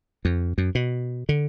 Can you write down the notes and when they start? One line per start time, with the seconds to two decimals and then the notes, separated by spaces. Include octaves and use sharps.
0.25 F2
0.58 F#2
0.75 B2
1.29 D3